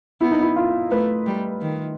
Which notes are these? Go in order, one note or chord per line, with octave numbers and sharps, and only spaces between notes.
B3 E4
D#4
E4
F4
A3 B4
G3
D#3